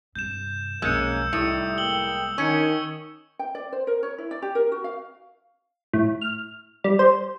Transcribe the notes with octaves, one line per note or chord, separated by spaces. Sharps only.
G2 C3 G6 E7
B1 F2 G#3 A#3 C#4 E6 G6 C#7
C2 A2 G3 D#4 E5 D#6 C#7
G#3 A#3 G5 E6 F#7 G7
D#3 C#4 C#6 G#6 C#7
G5
D5
C5
A#4
C#5
E4
D5
G4
A#4
F#4
F5
A2
F6
G3
C5